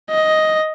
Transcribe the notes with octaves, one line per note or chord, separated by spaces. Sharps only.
D#5